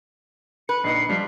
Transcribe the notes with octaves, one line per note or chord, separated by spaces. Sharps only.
B4 C#7
A#1 D#4 C7 C#7
F3 G3